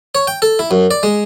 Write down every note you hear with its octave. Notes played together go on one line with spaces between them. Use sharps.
C#5
G5
A4
E4
F#2
D5
G#3